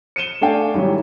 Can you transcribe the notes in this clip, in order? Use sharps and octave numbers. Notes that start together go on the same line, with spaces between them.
C#7 D#7 E7 G7
A3 D4 F5 G5 G#5
G#2 D#3 F#3 G3 E4